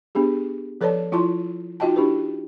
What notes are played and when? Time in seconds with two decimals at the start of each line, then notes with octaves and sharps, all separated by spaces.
0.15 B3 D4 G4 G#4
0.81 F3 A4 B4 C#5 D5 A5
1.12 F3 E4 F4 A5 C6
1.80 D#4 F4 F#4 D#5 G5 A5
1.96 D4 E4 G4 B4